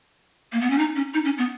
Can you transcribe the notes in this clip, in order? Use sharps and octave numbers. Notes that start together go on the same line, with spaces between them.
A#3
B3
C#4
D#4
C#4
D#4
C#4
B3